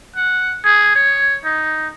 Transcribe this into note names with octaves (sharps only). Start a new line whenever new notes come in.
F#5
G#4
C#5
D#4